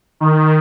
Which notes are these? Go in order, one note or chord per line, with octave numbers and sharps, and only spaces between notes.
D#3